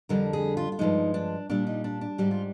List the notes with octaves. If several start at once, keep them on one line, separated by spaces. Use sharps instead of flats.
F2 D3 G3 A#4
G#4
F4
F4
G2 F3 G#3 D#4
D4
A#2 G3 D4
D#4
D4
D4
G#2 G3 G4
F4